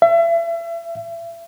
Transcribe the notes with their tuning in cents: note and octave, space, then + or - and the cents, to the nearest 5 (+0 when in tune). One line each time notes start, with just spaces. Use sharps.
E5 +35